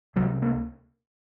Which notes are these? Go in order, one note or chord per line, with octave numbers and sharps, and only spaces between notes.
C#2 C3 F#3
A#3